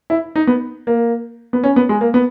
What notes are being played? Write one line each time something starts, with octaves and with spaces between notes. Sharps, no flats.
E4
D#4
B3
A#3
B3
C#4
B3
G#3
A#3
B3